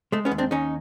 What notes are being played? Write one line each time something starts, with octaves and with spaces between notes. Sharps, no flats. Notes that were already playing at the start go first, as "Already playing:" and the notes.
G#3 A3
B3 C#4
D#2
C4 D4
D#2 C#4 D#4